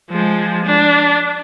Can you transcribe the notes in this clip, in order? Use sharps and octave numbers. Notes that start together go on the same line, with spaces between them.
F3 G#3
D4